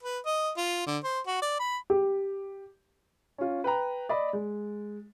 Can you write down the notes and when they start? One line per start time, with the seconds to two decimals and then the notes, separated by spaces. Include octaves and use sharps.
0.03 B4
0.26 D#5
0.57 F4
0.86 D3
1.04 C5
1.27 F#4
1.42 D5
1.59 B5
1.90 G4
3.38 C#4 F4
3.64 B4 G5 A#5
4.09 D5 D#5 B5
4.33 G#3